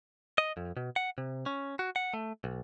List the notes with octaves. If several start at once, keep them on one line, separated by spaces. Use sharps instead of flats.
D#5
F2
B2
F#5
C3
C#4
F#4
F#5
A3
B1